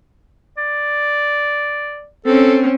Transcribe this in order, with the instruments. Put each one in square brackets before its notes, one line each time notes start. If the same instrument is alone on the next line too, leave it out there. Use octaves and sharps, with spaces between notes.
[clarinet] D5
[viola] C4 C#4 [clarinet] A4